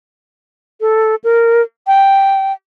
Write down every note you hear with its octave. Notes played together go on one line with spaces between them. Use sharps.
A4
A#4
G5